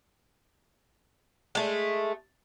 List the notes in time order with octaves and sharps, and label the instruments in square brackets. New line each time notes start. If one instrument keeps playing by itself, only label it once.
[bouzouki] G#3 A3